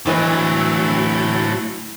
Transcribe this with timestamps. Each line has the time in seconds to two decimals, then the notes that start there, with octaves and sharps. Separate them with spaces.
0.06 D2 A2 E3 F#3 D#5